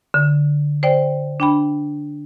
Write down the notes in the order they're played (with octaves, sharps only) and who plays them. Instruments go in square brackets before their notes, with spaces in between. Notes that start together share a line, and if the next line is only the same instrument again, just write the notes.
[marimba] D3
C5 D5 G5
D4 G5 B5